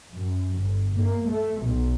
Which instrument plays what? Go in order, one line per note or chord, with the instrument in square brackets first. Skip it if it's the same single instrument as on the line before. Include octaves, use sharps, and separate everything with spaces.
[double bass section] F#2
G1
A#3
A3
B1